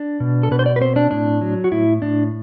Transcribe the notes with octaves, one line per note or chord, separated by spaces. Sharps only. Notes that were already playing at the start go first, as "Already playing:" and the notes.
Already playing: D4
B2
A4
B2 B4
C5
D5
B4
C4 C5
D4
A2 D4
F#3
F#4
A2 E4
A2 D4